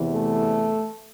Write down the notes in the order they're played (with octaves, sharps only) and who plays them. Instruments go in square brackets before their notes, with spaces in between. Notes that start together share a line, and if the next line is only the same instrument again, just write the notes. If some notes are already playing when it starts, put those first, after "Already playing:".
Already playing: [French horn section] E2 C3 E3
A3